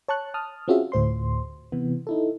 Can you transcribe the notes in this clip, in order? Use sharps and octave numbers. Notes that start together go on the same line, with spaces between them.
C#5 A5 C#6 F#6
A5 D#6 F6
C4 C#4 F4 F#4 G#4 E5
D2 A2 C5 C6
C3 E3 B3
D#4 E4 A4